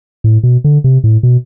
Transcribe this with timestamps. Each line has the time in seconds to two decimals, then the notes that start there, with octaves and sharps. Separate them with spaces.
0.24 A2
0.43 B2
0.64 D3
0.84 C3
1.04 A2
1.23 B2